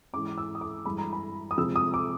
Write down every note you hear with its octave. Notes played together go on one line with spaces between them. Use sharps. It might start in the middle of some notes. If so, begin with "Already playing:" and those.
G#2 E3 G#3 C#4 D6
E6
D#6
D6
G2 E3 G#3 B5
A#5
B5
D#6
C3 F3 G#3 E6
D#6
D6